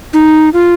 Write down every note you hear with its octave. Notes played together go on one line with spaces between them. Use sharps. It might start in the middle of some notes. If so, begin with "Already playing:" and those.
D#4
F4